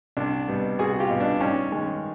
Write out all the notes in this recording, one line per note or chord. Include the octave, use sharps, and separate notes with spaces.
C2 D4
B2 G3 B3
C2 F#4 G#4
F4 G4
B2 G3 B3
D4
G2 C#4 D#4
D#3 G#3 C#4